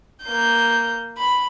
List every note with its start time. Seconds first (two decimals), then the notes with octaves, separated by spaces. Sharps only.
0.24 A#3 G6
1.18 B5